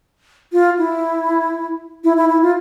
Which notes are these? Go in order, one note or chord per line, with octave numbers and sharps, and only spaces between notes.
F4
E4
E4
E4
E4
F4